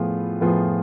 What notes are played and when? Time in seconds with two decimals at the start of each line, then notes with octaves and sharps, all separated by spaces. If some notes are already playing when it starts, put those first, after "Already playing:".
Already playing: A2 F3 B3 F4 G#4
0.41 A2 F3 B3 F4 G#4